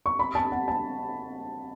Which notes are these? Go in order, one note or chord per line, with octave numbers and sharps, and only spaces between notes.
C#6
B5
A5
F#5
A5